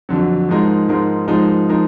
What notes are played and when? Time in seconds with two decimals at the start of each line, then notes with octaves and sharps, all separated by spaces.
0.09 F2 D3 F#3
0.49 G#2 F3 G#3 D#4 A#4
0.88 G#2 F3 G#3 D#4 A#4
1.28 G#2 F3 G#3 D#4 A#4
1.69 F3 G#3 D#4 A#4